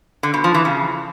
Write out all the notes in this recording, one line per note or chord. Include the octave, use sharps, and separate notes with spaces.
D3
B2
F3
E3
C#3